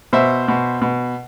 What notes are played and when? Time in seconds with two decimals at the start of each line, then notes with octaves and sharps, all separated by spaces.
0.13 B2 C5 E5
0.48 B2
0.82 B2